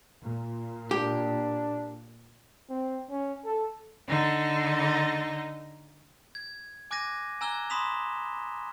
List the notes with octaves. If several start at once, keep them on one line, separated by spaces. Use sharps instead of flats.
A#2
D4 G4
C4
C#4
A4
D3 D#4
G#6
G#5 D6 F#6 G#6 A#6 D#7
G#5 A#5 E6 F#6 G#6 G7
B5 C6 D#6 B6 E7 F7